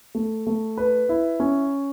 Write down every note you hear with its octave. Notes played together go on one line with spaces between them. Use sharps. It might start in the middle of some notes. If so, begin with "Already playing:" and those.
A3
A3
B4
E4
C#4